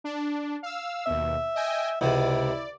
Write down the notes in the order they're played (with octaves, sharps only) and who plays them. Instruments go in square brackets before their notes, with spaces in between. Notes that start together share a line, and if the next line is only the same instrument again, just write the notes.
[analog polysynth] D4
F5 E6
[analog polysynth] D#2 B2 [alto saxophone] E5
[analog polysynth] D#5 G5 G#5
[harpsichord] C#2 C3 [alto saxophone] E4 [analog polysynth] D5